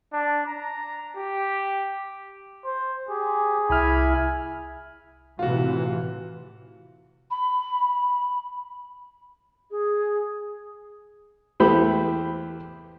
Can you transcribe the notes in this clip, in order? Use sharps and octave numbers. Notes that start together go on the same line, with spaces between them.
D4
A#5
G4
C5
G4 G#4
C2 E4 G#5 B5 F6
A2 C3 E3 F4 F#4
B5
G#4
E2 A3 G4 C5 B5